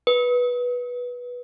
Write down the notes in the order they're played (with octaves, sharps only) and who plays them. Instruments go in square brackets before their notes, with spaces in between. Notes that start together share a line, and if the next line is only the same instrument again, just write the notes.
[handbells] B4